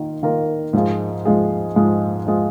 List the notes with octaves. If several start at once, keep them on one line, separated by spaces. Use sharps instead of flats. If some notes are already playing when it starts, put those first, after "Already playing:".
Already playing: D#3 A#3 F4
D#3 A#3 F4 A#4
G#2 F3 G#3 F4 G#4
G#2 F3 G#3 F4 G#4
G#2 F3 G#3 F4 G#4
F3 G#3 F4 G#4